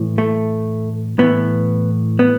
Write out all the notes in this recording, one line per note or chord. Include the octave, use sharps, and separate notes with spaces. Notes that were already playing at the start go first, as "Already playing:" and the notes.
Already playing: A2 E3
A3
A2 E3 B3
B3